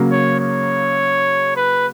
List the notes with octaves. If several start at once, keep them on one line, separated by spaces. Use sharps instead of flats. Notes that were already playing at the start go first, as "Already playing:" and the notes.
Already playing: C#3 F#3 A#3
C#5
C#5
B4